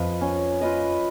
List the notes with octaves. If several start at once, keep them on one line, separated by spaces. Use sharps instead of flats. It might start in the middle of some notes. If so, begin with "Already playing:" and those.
Already playing: F2 F3 F4 B4 D#5
C#4
F4 B4 D#5